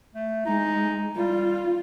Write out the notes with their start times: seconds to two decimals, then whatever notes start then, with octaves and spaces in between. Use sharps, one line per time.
0.15 A3
0.46 G#3 D#4
1.16 G3 F4